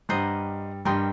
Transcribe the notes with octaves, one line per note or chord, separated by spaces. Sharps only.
G2 G3 C5 D#5 F#5 A#5
G2 G3 A#4 D#5 G5 C6